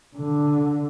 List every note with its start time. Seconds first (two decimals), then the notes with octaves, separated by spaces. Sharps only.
0.16 D3